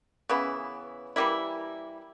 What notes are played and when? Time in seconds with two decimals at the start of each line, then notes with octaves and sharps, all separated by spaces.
0.29 C#3 E3 B3 E4
1.16 E3 G3 A#3 E4